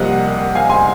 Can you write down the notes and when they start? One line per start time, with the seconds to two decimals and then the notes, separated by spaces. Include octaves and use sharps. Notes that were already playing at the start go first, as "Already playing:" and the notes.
Already playing: C2 C3 F3 A#3 D#5 F#5
0.55 F5 G#5
0.70 G#5 C6